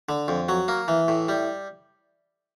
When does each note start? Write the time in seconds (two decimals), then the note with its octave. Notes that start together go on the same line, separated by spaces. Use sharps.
0.09 D3
0.28 F2
0.49 F#3
0.68 A#3
0.88 E3
1.08 A2
1.29 G3